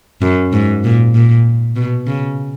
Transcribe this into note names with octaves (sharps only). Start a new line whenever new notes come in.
F#2
G#2
A#2
A#2
B2
C#3